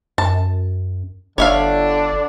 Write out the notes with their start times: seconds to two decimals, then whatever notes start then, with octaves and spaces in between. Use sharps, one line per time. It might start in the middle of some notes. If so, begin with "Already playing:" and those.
0.18 F#2 A5
1.38 G1 D3 D4 C#5 E5 F5